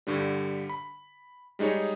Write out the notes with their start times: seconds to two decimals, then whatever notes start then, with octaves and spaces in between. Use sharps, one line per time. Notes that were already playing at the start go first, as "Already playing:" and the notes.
0.07 G2 D3 G3
0.70 B5
1.59 G3 G#3 D#4 G#4 C#5